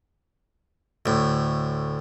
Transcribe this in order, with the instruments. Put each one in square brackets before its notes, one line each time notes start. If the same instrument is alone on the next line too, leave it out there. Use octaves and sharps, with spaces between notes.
[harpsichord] D2 A2